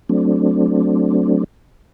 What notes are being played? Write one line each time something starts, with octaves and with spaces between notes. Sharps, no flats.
F#3 A3 C4 D4